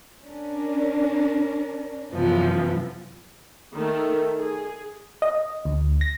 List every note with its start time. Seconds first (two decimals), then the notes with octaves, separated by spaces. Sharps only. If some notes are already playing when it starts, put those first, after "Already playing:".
0.22 C#4 D4 A#4
2.11 F#2 C3 E3 F3 B3
3.75 D#3 A3
4.37 G#4
5.22 D#5
5.65 D2
6.01 A#6